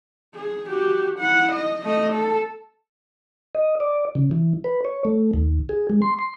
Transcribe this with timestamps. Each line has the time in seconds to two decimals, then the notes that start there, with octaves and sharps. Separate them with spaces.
0.34 G#4
0.69 F#4 G4
1.19 E4 F#5
1.52 D#5
1.84 A3 D#5
2.13 A4
3.55 D#5
3.80 D5
4.15 C#3
4.31 E3
4.64 B4
4.85 C#5
5.05 A3
5.34 D#2
5.69 G#4
5.90 G#3
6.02 C6
6.19 C6